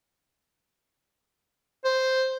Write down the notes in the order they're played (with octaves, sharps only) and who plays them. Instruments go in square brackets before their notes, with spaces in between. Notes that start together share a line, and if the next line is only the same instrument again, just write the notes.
[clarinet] C5